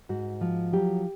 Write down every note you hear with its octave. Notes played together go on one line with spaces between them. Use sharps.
G#2 F#4
F3
F#3 G4